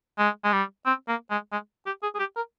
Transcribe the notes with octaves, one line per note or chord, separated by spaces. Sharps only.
G#3
G#3
G3
C4
A#3
G#3
G#3
G4
G#4
G#4
G4
A#4